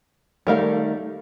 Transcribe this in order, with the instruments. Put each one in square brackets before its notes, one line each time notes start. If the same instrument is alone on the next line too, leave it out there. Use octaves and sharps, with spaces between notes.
[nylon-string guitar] D#3 A3 D#4 [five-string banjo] G3 A#4 F5